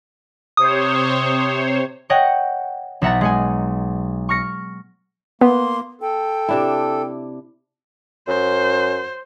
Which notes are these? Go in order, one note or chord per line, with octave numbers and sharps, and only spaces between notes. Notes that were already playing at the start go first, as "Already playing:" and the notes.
C3 C5 C#5 D#6
C#5 D#5 F#5 G5
B1 E5 F#5 A#5 A6
G#3 F#5 G#5
C#6 F6 A#6 C#7
A#3 B3 C6
A4 G5
C3 D4 E4
F#2 C5